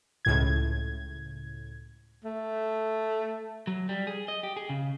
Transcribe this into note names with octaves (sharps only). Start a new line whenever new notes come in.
C#2 A2 G#6
A3
F#3
G3
G#4
D#5
G4
G#4
C#3